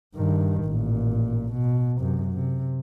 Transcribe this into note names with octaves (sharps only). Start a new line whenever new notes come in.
G2 D#3
A1 A#2
B2
F#2 C3
C3